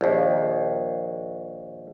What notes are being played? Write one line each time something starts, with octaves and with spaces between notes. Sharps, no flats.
A#1 D#2